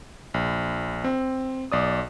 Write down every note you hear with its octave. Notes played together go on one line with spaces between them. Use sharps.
A#1
C4
B1 D5 D#6